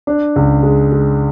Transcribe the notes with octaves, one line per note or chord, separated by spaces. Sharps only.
D4
C#2
G#3
G#3